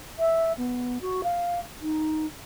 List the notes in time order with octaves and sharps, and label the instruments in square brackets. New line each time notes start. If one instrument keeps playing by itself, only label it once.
[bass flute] E5
B3
F#4
F5
D#4